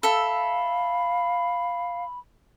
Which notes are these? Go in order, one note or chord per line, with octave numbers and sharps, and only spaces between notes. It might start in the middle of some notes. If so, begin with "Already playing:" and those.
A4 E5 F5 B5